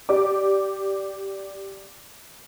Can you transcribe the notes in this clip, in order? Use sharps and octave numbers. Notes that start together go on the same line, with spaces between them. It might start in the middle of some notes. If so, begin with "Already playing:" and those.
G4 D5 D6